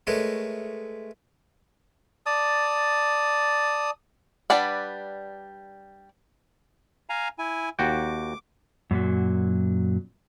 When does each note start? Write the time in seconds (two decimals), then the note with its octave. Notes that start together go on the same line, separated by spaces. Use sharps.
0.07 G#3 A3 A#4 B4 C#5
2.26 D5 A5 D#6
4.50 G3 D4 B4 D5 F#5
7.10 F5 G#5 A#5
7.39 E4 G#5
7.79 D#2 F#4 G5 D6
8.91 F#2 A#2 F#3